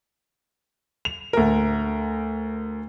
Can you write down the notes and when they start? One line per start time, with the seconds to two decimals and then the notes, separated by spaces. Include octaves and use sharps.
1.05 F7
1.33 D2 A#4